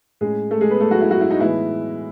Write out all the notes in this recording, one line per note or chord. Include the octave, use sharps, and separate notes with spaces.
A2 G#3 C#4 G#4
A3 A4
G#3 G#4
B3 B4
A3 A4
F#3 F#4
E4
F#3 F#4
E4
D#4
A2 E3 G#3 B3 E4